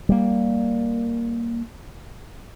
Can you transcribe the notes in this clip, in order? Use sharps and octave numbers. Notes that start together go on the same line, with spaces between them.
G3 A#3